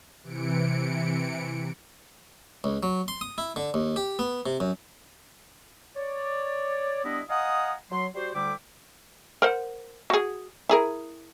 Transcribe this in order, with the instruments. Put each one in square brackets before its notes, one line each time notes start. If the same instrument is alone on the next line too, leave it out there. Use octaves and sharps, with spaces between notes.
[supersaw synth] C3 E3 C#7 D7
[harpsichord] C#2
F#3
C6
D#6
E4
D3
D#2
G4
B3
C3
F#2
[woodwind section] C#5 D5
G3 B3 D4 E4 D#5
D#5 F5 F#5 G#5 A#5 D#6
F#3 C6
G3 F#4 G4 C5
D2 D3 G3 E4 G5 D6
[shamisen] A#4 C5 F#5
F#4 G#4
E4 G#4 A#4